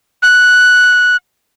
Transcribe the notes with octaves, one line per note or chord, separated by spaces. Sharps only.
F#6